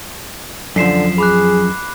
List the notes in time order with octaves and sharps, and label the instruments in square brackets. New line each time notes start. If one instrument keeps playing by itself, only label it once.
[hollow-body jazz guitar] F#2 F3 [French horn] D3 [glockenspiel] B6 C7 E7
[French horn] G#4 [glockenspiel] B5 D6 F#6